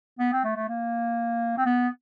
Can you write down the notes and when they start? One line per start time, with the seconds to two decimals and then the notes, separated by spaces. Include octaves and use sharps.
0.19 B3
0.33 C4
0.44 A3
0.56 A3
0.68 A#3
1.57 C4
1.66 B3